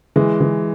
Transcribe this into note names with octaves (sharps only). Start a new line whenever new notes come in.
E3 G#3
E3